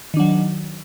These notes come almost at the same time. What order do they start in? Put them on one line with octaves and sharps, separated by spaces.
D#3 D4 F#3